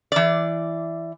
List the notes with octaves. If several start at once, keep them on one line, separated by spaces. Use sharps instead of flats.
E3 D5